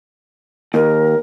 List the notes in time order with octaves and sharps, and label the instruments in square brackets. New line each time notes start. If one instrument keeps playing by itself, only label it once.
[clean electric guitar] D#2 [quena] A#4